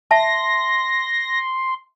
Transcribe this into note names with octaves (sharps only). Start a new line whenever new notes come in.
E5 A5 C6 A#6